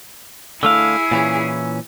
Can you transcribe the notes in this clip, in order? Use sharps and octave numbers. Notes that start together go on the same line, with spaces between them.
D3 A3 E4 G#4 F5 E6
A#2 E3 C#4